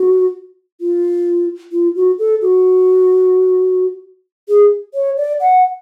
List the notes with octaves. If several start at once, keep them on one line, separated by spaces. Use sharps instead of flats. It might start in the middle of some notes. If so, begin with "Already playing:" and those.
Already playing: F#4
F4
F4
F#4
A4
F#4
G#4
C#5
D5
F#5